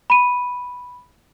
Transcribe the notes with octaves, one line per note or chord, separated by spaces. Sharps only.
B5 D#7